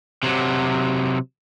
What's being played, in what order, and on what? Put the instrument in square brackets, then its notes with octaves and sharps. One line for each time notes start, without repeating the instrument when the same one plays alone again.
[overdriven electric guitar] C3 F#3